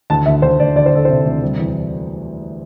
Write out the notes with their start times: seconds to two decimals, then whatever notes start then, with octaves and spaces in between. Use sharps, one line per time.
0.10 D2 A5
0.26 D2 E5
0.42 D2 C5
0.59 D2 D5
0.75 D2 D5
0.86 C5
0.92 D2 A4
1.05 C3 C5
1.26 D2
1.42 G3
1.58 E2